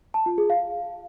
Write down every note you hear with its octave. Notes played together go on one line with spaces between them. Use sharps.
A5
F4
G#4
F5